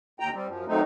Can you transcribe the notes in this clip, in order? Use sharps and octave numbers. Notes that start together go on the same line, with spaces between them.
D#2 G5 A#5
G3 C4
F#2 F3
D#3 F#3 A3 C4 D#4